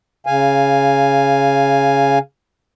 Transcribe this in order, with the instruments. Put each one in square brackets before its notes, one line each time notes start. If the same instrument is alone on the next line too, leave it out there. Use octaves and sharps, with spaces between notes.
[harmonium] C#3 F5 G#5